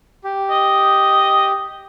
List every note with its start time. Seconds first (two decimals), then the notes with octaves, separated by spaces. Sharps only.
0.24 G4
0.50 D#5